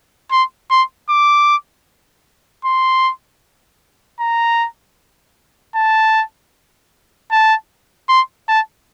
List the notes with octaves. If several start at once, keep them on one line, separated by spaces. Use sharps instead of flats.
C6
C6
D6
C6
A#5
A5
A5
C6
A5